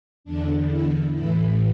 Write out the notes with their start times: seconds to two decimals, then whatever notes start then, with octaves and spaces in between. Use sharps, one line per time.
0.24 E2 D3 D4
0.70 E4
1.13 A2 E3 E4